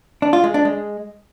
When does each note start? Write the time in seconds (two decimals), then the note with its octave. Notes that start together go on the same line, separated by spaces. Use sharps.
0.22 D4
0.33 F4
0.44 G#3
0.54 D4
0.65 G#3